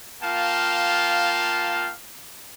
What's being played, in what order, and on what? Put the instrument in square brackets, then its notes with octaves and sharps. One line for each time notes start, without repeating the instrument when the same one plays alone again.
[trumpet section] A#3 F4 F5 G5 A5